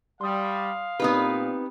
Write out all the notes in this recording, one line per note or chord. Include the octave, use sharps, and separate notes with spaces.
G3 F5 C6 D#6
A#2 B3 C4 D#4 G4 B4